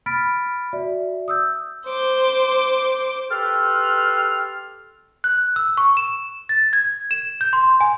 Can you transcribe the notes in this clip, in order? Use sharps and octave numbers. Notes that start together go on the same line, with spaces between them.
B5 F6 A6 B6 D7
F#4 D5 E5
D#6 E6 G6
C5 D6
G4 A4 B4 C6 F6
F#6
E6
C#6
E7
A6
G#6
E7
G6
C6
G#5